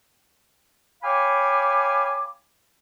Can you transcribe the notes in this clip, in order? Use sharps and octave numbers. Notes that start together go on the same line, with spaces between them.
C#5 F5 G5 G#5 B5 D6